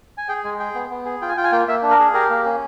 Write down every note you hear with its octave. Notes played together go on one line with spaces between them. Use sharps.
G#5
G#4 G5
G#3 G#5
G#4 G5
B3
B3
G#4
F4 G5
G#5
F4 G5
G#5
A#3 G5
A#3 E5
D4
A#4
G#4
G4 A#4
A#3
C#4